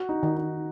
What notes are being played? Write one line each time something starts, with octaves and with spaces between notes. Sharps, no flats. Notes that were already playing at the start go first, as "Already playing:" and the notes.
Already playing: F#4
D#4
D#3
D#4